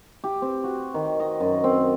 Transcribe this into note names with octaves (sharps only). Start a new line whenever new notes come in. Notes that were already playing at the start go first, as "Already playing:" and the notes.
G4
C4
F#4
D#3
D#5
F#2
C4